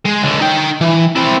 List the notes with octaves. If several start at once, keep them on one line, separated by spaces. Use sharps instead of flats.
G#3
C#2 D3
D#4 G5
E3
C4 E4